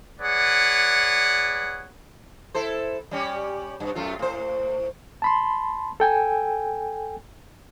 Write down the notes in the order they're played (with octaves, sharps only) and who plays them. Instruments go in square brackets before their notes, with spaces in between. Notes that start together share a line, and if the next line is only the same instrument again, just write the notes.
[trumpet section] G#4 B4 C#5 D5 F#5
[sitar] E4 A4 C5
G3 C#4 G4
G2
F#2 A3 F4
A2 C5
[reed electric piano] A5 B5 C6
A4 G5 G#5